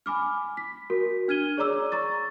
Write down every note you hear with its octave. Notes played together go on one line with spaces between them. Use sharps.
G#5 B5 D6 F6
B6
F#4 A#4
D4 F6 G#6 D#7 G7
G#4 C#5 D5 A#5 D6 E6
A#5 C#6 A6